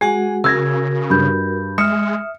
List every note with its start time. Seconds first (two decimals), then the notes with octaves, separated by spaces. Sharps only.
0.01 G#3 F#4 G#4 F#5 G#5
0.44 C#3 F#4 A#4 E6 G#6 A#6
1.10 G2 B5 G6
1.78 G#3 E5 D#6 F6 C#7